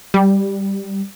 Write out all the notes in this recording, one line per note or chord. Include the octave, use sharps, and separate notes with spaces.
G3